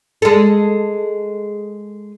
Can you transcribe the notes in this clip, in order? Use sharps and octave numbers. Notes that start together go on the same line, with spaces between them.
G#3 A4